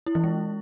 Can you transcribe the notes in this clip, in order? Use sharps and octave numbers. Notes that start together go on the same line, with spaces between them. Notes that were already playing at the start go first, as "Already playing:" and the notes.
E4
E3
G#3